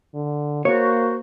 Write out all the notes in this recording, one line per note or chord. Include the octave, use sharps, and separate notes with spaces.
D3
A#3 F#4 C5 C#5